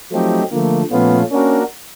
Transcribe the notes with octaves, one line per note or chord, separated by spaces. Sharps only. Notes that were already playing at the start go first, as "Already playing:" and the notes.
F3 F#3 A3 C4 D#4 G4
D3 F3 A3 A#3
A#2 F3 A3 B3 C#4 F4
A#3 C#4 D4 F#4 A#4